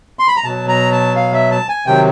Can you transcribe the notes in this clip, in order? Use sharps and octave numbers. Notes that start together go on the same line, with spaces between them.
C6
B5
A#5
B2 F#3 A5
A#5
A5
F5
E5
A5
G#5
C3 D#3 F#3 G5